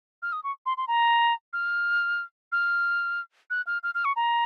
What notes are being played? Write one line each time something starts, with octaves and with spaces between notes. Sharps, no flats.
F6
D#6
C#6
C6
C6
A#5
F6
F6
F#6
F6
F6
F6
C#6
A#5